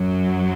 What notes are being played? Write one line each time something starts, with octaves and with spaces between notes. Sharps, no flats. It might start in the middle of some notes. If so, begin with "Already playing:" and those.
Already playing: F#2 F#3